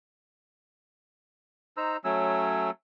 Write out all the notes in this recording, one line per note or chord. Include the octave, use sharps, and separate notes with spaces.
D#4 C5 A#5 E6
F#3 A3 C#4 E6